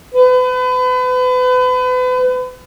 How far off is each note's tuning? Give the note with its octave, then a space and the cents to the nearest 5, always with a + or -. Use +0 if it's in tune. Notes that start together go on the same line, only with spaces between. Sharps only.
B4 +35